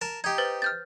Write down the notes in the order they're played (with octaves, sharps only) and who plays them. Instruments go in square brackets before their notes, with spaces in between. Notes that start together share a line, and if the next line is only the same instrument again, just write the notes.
[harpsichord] A#4 A5
[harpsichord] D#4 G4 [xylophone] G#6
[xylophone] B4 C5 A6
F6 G6 A6